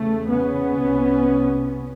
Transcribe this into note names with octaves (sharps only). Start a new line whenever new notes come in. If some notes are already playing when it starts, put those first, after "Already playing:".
Already playing: E2 C#3 A3
B3 C#4
C2 C3